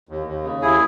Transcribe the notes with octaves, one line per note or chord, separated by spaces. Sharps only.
D#2
D#2
C#3
D#2 E4 G#4